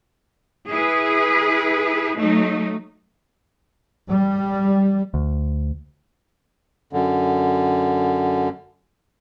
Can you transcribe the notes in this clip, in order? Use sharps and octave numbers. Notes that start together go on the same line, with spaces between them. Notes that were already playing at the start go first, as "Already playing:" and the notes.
E4 G#4 B4
F#3 A3 D#4
G3
D2
F#2 D3